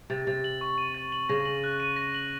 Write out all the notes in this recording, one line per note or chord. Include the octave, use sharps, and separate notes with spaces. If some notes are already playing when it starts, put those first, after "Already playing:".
C3 A6
C3 A6
F#7
C#6
D#7
A6
F#7
C#3 A#6
F#7
F#6
D#7
A#6
F#7